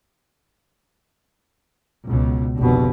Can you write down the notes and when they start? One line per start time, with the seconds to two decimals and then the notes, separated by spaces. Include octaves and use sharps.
2.07 C#2 B2
2.59 F1 A#1 B2 D3